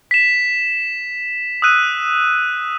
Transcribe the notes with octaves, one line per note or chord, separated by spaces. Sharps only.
B6 E7
D#6 E6 F#6 D#7